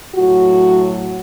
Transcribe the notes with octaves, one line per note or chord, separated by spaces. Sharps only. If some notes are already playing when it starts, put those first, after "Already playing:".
A2 F#3 F#4